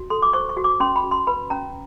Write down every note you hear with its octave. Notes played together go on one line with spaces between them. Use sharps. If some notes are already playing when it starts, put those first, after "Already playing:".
Already playing: F#4
A4 C6
D6
C5 C#6
C#6
F#4
D6
C#4 C6
B5
F#4
C6
B4 B5
C#4 A#5